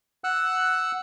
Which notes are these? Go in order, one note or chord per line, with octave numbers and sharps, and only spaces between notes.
F#5 E6 F#6